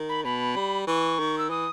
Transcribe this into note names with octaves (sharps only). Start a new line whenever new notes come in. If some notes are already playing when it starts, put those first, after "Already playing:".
Already playing: D#3
B5
B2 B5
G3
E3 C#6
D#3
E6
E3 D#6